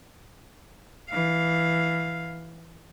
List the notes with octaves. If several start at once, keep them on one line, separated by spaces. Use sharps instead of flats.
E3 F5